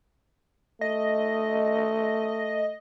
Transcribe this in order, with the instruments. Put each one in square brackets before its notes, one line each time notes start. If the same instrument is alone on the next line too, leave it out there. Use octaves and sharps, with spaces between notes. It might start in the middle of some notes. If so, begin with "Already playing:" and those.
[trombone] A3 [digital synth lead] D#5